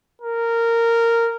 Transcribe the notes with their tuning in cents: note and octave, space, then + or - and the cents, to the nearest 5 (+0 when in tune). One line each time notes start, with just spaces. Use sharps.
A#4 -10